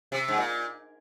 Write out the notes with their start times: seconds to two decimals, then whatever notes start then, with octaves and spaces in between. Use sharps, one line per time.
0.12 C3
0.28 G#2
0.38 A#2